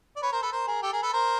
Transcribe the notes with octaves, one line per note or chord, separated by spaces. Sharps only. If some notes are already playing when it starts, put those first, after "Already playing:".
D5
B4 C#5
A#4 C5
A4 B4
A#4 C5
G#4 A#4
G4 A4
G#4 A#4
A4 B4
A#4 C5